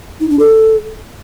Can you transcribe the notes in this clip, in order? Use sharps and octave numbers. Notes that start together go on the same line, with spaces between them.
D#4
D4
A4